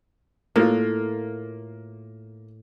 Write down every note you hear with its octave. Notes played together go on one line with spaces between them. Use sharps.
A2 A#3 F4